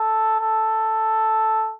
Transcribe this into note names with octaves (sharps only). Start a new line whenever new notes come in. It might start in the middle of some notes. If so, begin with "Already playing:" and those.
Already playing: A4
A4